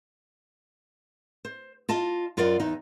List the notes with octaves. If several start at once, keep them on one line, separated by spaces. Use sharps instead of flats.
C5
F4 D#5 A5
F#2 F4 A#4 D5 F#5
E2 D#4